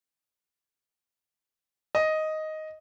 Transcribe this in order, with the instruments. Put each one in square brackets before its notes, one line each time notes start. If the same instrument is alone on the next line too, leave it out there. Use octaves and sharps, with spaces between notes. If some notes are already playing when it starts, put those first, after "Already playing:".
[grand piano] D#5